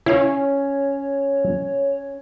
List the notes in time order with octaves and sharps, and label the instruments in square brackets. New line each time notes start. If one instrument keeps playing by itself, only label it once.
[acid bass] C#4 [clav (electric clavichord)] E4 F5 [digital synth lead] C#5